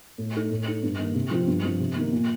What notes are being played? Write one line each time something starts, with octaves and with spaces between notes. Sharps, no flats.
A2
A3 D#4
A2
A3 D#4
G2
D#3 A#3
C3
F3 C4 F4
G2
F3 C4
C3
D#3 A#3
A#2